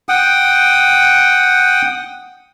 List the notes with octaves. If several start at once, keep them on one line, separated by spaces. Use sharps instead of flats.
F#5 G5 D#6